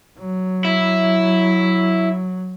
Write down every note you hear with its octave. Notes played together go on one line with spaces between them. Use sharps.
F#3
E4